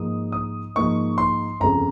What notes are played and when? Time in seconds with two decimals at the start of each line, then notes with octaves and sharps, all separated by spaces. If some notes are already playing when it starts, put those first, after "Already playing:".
Already playing: G#2 F3 A#3 D#4 D#6
0.32 D#6
0.75 G#2 F3 A#3 D#4 C#6
1.18 C6
1.60 G1 F2 C#3 A#5